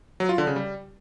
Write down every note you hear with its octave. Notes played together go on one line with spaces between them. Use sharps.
F#3
F4
D3
C#3
G3